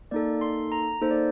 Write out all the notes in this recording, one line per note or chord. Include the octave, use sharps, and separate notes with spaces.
A#3 D#4 A4 D5
C6
A#5
A#3 D#4 A4 C5
D5